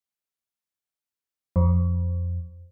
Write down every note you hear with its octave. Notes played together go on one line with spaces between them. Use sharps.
F2